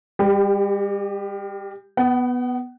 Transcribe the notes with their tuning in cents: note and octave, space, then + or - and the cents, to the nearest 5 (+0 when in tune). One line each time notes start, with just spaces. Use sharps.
G3 +40 G4 +0
B3 +0 F#5 +40